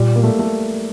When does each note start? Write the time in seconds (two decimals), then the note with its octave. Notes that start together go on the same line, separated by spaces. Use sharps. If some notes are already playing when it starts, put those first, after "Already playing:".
Already playing: A#2 G3
0.16 A#3
0.24 A3
0.39 A3